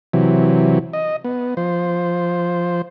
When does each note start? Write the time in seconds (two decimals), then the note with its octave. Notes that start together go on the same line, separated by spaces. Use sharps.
0.13 C3 E3 F#3
0.93 D#5
1.24 B3
1.57 F3 C5